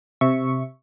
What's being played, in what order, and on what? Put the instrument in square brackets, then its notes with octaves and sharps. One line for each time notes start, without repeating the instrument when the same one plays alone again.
[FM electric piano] C3 E5 C#6